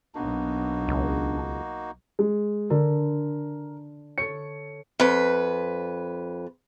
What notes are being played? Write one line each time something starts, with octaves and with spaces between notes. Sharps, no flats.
B1 A#3 B3 D4 D#4 F#4
C#2
G#3
D3 A#4
A4 C#5 C#7
F2 B4